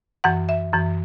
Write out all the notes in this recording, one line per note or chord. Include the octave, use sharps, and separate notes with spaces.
F#2 E3 F#5
E5
F#2 E3